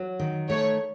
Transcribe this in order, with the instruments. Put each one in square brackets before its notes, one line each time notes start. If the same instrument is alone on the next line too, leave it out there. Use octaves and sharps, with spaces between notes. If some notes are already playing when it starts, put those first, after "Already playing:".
Already playing: [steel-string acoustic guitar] F#3
D#3
[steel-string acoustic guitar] A3 [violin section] C#5